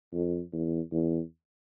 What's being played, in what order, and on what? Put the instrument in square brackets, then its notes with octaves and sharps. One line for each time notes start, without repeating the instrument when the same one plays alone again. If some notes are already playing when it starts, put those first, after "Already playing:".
[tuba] F2
E2
E2